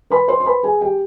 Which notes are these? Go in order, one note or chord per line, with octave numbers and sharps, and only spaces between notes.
B4 B5
C5 C6
C6
B4 B5
G#4 G#5
G4 G5